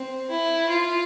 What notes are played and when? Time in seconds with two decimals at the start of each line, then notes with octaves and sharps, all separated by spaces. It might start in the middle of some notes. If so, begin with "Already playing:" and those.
Already playing: C4
0.30 E4
0.69 F4